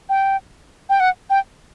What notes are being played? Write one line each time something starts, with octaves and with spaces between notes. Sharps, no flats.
G5
G5
F#5
G5